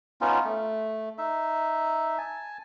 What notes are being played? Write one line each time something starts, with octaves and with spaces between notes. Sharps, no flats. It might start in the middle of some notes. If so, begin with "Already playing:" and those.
B3 C#4 D#4 F4
A3
D#4 E5
G#5 A5